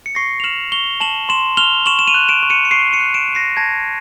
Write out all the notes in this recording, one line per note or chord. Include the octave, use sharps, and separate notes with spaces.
C#7
C#6 A#6 C7
F7
F6 E7 F#7
C#6 F7 G7
A5 E7 F#7
C6 E7 F#7
F6 F7 G7
C#6 E7 F#7
E7
D#7 F7
F#6
D7 E7
C#6
C#7 D#7
C#7
C#6 C7 D7
C#7 D#7
F#6
D7 E7
C#6
A#6 C7
A5 G#6 A#6